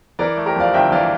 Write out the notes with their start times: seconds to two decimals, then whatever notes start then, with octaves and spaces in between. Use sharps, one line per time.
0.19 E3 A#4 D5
0.37 A3
0.46 G4 A#4
0.55 F2 D5 F5
0.74 G1 E5 G5
0.92 E3 D5 F5